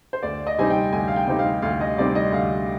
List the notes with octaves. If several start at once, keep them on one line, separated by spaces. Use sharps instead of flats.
C5
D2 D5
D#5
C3 G3 C4 D#4 G#5
G5
D2 G#5
F5
G5
C3 G3 C4 D#4
F5
D2 F5
D#5
C3 G3 C4 D#4 D5
D#5
D2 F5